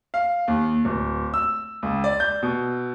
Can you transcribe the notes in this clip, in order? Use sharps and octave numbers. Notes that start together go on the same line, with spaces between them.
F5
D#2
D1
E6
C#2
D5
G6
B2